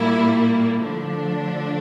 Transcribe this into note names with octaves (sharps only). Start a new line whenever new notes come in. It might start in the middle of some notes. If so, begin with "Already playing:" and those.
Already playing: A#2 G3 A#3 E4
D3 F3 A3 D4